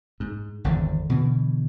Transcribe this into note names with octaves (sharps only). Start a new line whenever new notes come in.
G#2
G#1 E2 D3
B2 D3 E3